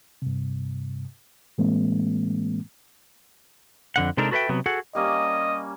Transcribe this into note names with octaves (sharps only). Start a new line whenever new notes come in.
G2 C3
A2 E3 G#3 A#3 C4
F2 D3 F#5
C3 G#3 D4 D#4 A4 A#4
F#4 A4 B4 C#5 E5 G5
C3 F#3 B3
F#4 G#4 A4 F#5
G3 A#3 C#4 D#5